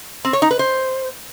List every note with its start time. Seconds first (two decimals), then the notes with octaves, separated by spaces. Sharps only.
0.25 C4
0.33 C#5
0.42 D#4
0.51 B4
0.59 C5